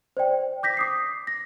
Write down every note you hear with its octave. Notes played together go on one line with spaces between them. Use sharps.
C5 D5 G5
D6 G6 A#6 B6
D6 D#6 C7
A#6